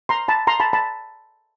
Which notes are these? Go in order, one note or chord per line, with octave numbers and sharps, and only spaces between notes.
A#5 C6
A5 B5
A#5 C6
A5 B5
A5 B5